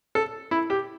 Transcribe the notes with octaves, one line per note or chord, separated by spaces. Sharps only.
A4
E4
G4